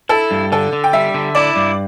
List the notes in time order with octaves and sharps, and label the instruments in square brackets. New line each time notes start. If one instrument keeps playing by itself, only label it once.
[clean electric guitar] E4 [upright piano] A4
[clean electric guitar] G2
[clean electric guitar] D3 [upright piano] A4
[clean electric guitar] D3
[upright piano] G5
[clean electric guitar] G3 [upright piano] E5
[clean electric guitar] D3
[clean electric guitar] E4 [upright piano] D5
[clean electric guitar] G2